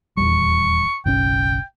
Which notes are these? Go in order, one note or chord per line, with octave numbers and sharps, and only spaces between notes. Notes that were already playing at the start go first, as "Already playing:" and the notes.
D#1 E2 G3 C#6
F#1 B1 C#4 G5